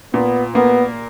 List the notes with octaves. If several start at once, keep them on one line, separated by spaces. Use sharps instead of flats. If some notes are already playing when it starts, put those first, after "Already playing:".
A#2 B3
A#3 B3